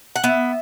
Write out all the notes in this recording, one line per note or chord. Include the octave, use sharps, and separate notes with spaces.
F#5
B3 E5